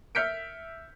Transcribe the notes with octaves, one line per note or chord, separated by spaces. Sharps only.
E5 F6 G6 B6 C#7 D7